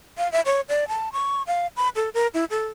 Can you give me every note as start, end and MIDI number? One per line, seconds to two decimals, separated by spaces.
0.18 0.30 77
0.32 0.41 76
0.46 0.61 73
0.69 0.88 74
0.88 1.09 81
1.13 1.42 85
1.47 1.67 77
1.77 1.89 83
1.96 2.09 69
2.14 2.27 70
2.34 2.45 64
2.51 2.67 69